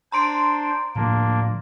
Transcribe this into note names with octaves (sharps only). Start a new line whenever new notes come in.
D4 C5 A#5 C6 D7
A2 D3 F3 A#3 D4